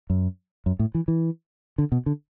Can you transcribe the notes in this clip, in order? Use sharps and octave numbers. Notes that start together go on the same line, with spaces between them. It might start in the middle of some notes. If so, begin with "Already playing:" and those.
F#2
F#2
A2
E3
E3
D3
B2
D3